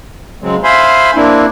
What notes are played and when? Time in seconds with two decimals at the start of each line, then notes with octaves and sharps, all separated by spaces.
0.42 C#3 F#3 G#3 C4
0.64 C5 E5 F5 G#5 B5 C6
1.16 A#3 C4 D4 E4